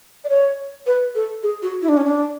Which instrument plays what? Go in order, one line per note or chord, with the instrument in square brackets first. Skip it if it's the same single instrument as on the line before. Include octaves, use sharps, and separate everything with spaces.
[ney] D5
C#5
B4
A4
G#4
F#4
E4
D4
C#4
D4